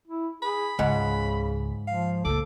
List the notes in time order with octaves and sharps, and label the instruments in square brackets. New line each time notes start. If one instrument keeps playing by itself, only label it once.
[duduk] E4
[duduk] G#4 [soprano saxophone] B5
[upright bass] C#2 [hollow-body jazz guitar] G#2 F#5 [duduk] C#3
[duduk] F3 [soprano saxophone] F5
[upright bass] C#2 A#2 [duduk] A4 [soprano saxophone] D6